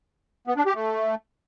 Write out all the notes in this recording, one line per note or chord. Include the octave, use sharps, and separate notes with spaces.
B3
D4
G4
A3